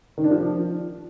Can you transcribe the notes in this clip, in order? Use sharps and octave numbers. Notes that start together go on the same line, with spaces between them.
D#3
D4
F3